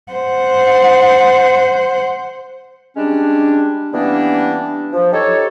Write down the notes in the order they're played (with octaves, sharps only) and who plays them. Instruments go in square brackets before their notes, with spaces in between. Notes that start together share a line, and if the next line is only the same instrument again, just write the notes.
[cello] C5 F#5
[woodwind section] G3 G#3 C#4 D4
E3 G3 A#3 B3 C#4 D4
F3
D#4 G4 A4 C#5